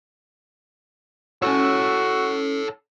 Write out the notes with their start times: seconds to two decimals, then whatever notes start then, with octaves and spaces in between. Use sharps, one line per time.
1.42 C#4 F#4 A4 C#5 E6